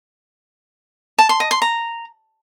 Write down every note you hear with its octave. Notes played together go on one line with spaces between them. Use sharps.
A5
C6
D#5
C6
A#5